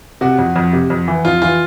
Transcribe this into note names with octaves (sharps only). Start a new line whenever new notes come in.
C3 F#4
F2
F2
C3
F2
E3
F2 F4
E3 F4